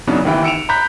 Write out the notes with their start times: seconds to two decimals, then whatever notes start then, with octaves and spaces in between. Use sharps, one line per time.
0.07 C#3 E3 F#3 B3 D4 D#4
0.25 D#2 D#3 E3 E4 G5
0.43 E6 C#7 D7 E7 F7
0.69 A#5 B5 F#6 G6 B6